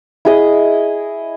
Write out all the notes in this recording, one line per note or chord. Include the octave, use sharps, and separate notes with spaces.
E4 G#4 D#5